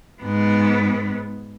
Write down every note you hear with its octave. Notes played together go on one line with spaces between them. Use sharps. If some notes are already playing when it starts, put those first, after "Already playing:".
G#2 B3